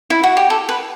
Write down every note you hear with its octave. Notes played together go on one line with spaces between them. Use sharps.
E4
F#4
G4
A4
B4